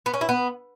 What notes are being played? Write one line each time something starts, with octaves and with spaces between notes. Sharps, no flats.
B3
C#4
E4
B3